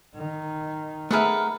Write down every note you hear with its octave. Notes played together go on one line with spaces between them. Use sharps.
D#3
A3 G#4 A#4 B4 E5 F#5